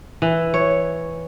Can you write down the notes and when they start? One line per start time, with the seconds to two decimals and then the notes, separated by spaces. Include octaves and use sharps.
0.22 E3
0.54 C#5